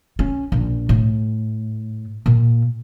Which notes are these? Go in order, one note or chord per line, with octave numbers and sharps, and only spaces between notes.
C#4
A#1
A2
A#2